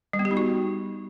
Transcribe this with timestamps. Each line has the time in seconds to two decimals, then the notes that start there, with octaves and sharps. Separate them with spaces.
0.13 G3
0.19 B3
0.25 G4
0.31 D#4
0.37 F#4